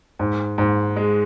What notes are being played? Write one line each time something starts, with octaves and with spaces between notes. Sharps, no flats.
G#2
G#2
G#3